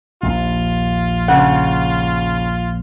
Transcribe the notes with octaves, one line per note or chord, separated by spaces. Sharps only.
A#1 D#2 F4
C#3 F#5